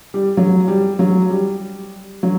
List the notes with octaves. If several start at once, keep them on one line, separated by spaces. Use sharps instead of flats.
G3
F#3
G3
F#3
G3
F#3